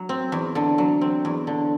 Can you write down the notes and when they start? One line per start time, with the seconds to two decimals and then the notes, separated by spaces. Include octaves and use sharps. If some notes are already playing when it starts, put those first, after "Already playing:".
Already playing: F#3
0.09 C4
0.32 E2
0.55 D3
0.78 F#3
1.01 C4
1.25 E2
1.47 D3